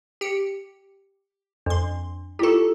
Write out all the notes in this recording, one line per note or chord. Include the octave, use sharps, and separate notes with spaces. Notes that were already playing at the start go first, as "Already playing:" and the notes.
G4 C#7
F2 D4 C6
E4 F4 G4 A4 C#6